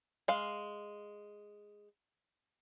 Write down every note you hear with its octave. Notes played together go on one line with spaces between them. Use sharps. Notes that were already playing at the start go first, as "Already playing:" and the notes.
G#3 F5